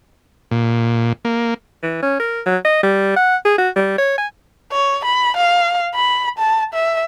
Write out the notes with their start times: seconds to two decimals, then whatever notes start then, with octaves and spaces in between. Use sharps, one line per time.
0.51 A#2
1.25 A#3
1.83 E3
2.03 C#4
2.20 A#4
2.46 F#3
2.65 D#5
2.83 G3
3.16 F#5
3.45 G#4
3.58 F#4
3.76 G3
3.98 C#5
4.18 G#5
4.72 C#5
5.05 B5
5.37 F5
5.96 B5
6.38 A5
6.74 E5